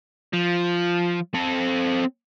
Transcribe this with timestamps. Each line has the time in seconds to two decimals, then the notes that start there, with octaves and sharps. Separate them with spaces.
0.33 F3
1.34 C4 A4